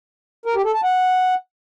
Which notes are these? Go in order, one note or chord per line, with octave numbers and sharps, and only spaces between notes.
A#4
G4
A4
A5
F#5